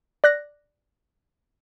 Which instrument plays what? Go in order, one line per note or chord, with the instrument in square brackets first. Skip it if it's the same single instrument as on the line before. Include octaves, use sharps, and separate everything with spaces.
[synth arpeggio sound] D5 F#6 A#6